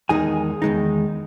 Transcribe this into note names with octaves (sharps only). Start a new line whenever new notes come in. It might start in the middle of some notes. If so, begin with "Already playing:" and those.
E2 D#3 G#3 D#4 G#4 G#5
E2 D#3 G#3 D#4